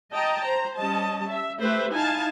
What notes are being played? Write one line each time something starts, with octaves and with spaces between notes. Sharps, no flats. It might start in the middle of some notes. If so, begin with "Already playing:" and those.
D#5 G5 A5 A#5
C5 A#5
G3 C#4 D#5 A5
E5
A3 G4 B4 C5 E5
D#4 E4 F5 G#5 A5